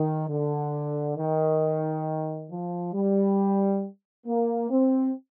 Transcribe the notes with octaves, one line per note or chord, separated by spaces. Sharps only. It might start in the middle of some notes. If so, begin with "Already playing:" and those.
Already playing: D#3
D3
D#3
F3
G3
A#3
C4